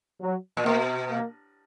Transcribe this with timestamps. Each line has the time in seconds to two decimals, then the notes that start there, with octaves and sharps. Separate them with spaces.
0.21 F#3
0.57 A#2
0.65 B2 A#3
1.10 A#3